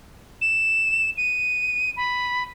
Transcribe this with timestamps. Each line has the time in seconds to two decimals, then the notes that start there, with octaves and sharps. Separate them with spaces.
0.41 E7
1.17 D#7
1.97 B5